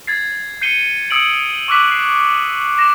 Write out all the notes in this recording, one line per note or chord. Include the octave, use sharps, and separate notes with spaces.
G#6 A6 C7
G6 C7 C#7 D#7 G7
D#6 E6 G#6 C#7 D7 F#7
C#6 D6 E6 F#6 B6
C7
D6 A#6 E7